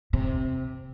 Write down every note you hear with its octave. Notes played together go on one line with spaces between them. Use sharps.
C3